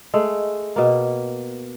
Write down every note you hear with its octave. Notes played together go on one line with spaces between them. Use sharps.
G#3 A3
B2 A#3